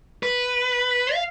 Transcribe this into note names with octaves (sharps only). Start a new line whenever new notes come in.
B4
F5